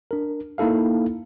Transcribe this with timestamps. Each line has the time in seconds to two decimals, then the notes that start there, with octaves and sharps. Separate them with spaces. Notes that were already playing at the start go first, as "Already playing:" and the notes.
0.11 D4 A#4
0.58 A#3 D#4 E4 A4 F5